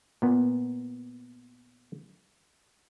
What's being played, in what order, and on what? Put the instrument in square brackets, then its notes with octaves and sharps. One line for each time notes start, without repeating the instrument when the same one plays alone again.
[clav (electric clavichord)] A#2 B3